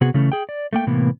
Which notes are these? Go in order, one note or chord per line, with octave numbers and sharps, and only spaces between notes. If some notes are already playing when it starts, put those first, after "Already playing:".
C3 B3 F#4 G#4
C#3 E3 A3 C#4
G#4 G5
D5
A3 A#3 G5
A2 C3 E3 A#3 B3